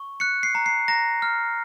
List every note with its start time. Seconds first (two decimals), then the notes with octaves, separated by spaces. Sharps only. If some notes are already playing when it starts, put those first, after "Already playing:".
Already playing: C#6
0.20 F#6 C#7
0.43 C7
0.55 A#5
0.66 C7
0.88 A#5 A#6
1.22 F6